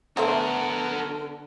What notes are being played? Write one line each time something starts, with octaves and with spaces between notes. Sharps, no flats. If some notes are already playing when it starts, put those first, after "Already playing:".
D3 F#3 A3 B3 F#4 A#4 C5